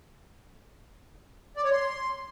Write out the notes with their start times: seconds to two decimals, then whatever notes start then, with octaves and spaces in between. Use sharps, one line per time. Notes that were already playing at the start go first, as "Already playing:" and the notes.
1.57 D5
1.64 C#5
1.72 C6